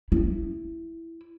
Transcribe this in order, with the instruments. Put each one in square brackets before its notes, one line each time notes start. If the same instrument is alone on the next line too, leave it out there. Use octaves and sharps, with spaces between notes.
[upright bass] E4